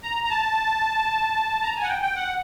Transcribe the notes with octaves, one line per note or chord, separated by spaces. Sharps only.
A#5
A#5
A5
A#5
G#5
F#5
G5
G5
F#5